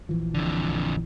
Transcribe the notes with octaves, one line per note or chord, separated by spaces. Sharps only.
A#1 E3 F3
F2 D3